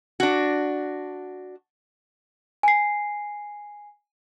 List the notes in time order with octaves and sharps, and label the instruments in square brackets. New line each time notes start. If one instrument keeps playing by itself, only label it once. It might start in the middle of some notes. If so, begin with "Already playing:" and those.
[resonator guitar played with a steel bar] D4 F#4
[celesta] G#5 C7